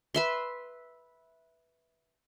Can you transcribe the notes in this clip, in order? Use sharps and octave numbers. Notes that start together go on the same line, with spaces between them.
B4 E5 C6